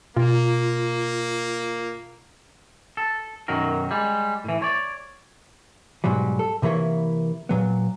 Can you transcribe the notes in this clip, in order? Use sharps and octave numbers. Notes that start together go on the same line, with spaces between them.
B2 A#3 F4
A4
B1 F#2 D#3 F#3 A#4
G3 G#3
A2 E3
C#5 D5
G#2 B2 F#3 G3
A4
C3 E3 A#3 E4 C#5
A#2 F#3 B3